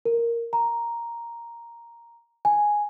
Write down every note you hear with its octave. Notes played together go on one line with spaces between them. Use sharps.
A#4
A#5
G#5